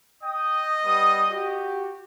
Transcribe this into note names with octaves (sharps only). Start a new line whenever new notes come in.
D#5 G5 D#6
G3 B3 D#6
F#4 G4